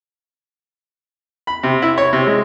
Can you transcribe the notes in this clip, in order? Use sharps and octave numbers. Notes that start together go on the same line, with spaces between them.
B5
C3
E4
C#5
C3
G#3